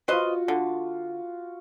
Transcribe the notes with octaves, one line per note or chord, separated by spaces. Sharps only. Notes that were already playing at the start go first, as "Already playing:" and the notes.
F4 F#4 B4 C5 D#5
D3